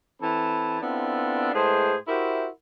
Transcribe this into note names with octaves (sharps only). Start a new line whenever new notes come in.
E3 C4 A4 A5 B5
B3 C4 D4 E4 F4 A4
A2 G#3 G#4 B4 C5
E4 F#4 G4 A#4 C5 E5